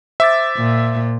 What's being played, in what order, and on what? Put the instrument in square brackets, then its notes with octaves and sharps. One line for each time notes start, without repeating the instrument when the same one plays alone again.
[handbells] C5 D6 A6 [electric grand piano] E5
[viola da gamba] A#2